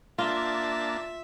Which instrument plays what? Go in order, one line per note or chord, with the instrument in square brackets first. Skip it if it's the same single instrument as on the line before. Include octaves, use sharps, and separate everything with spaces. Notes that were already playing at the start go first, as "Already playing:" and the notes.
[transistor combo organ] A#3 D4 A5 [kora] F4 [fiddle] E5